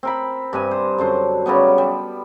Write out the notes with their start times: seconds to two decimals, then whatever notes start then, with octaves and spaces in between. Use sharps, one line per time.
0.03 C4 A#4 B5
0.53 G2 C3 G#5
0.71 C5
0.98 F#2 D3 C5 A5
1.46 C#3 F#3 G3 B3
1.78 G3